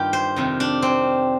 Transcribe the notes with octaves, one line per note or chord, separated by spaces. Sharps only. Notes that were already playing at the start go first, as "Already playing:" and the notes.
Already playing: G2 D#3 F4 G4
C5
F2 C3 D#3
D4
C4